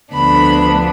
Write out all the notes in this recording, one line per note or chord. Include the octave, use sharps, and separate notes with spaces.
D2 D3 F3 B3 D4 B5